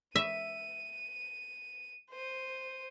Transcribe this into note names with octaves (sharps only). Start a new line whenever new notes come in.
E5 D#7
C5 D#7